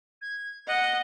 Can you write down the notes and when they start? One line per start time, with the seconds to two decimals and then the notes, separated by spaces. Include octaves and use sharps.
0.21 G#6
0.67 D#5 F#5